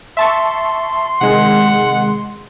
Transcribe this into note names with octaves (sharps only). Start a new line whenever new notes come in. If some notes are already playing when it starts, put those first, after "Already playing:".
E5 A5 C6 C#6
C3 D#3 G#3 F#5